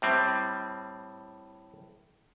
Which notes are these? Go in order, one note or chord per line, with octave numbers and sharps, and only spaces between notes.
A2 G3 C4